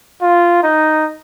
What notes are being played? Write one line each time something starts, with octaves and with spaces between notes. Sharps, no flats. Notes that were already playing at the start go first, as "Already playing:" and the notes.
F4
D#4